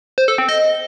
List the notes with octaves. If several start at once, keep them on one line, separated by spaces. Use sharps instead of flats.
C5
A4
C4
D#5